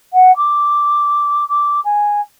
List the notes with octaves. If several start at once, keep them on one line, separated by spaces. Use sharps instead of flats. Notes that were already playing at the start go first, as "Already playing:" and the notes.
F#5
D6
D6
G#5